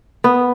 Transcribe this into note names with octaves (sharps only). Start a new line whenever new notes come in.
B3